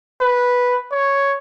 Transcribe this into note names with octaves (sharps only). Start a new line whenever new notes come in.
B4
C#5